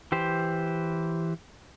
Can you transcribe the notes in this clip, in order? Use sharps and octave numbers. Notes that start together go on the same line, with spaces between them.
E3 G4 C5